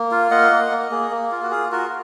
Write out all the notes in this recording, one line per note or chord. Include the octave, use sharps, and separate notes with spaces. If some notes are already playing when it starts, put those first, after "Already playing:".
Already playing: A#3
F4
A#3 D#5 F#5
A#3
A#3
A#3 G#4
A#3
F4
F#4
F4 G#4
F4 F#4 A#4